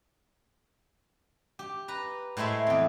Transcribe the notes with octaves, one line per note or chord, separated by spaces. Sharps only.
G4
B4 A#5
A2 G#3 A3 C5 E5
E2 C4